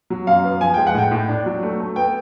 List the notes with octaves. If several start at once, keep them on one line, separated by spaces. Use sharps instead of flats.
F#3
F#2 F5
B3
F3 G#5
G#3 G5
F#5
A2 G5
A2
D4
F#3
A3
A3
B3 G5